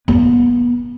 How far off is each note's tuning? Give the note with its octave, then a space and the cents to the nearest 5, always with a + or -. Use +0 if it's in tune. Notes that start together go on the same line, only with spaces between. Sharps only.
B3 -30